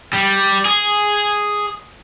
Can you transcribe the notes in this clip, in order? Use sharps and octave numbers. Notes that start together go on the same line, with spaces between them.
G3
G#4